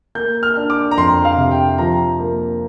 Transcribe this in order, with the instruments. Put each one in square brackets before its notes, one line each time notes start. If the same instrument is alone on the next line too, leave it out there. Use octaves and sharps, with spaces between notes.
[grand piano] A#3 G6
F6
D4
D6
A#5
F2 C6
F5
C3
G5
F3 A#5
A#3